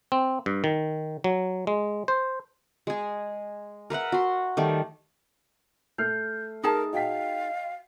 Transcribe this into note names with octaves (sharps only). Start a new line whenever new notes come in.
C4
G2
D#3
F#3
G#3
C5
G#3 G#4
A#4 B4 E5 F#5
F#4 C6
D#3 G3 A3
A3 F6 G6 C7
D#4 G#4 A#4 A5 D#6
F#4 D#5 F5 G5 B6